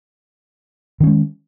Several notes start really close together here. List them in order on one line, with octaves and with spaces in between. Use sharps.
D#3 C#4 G#3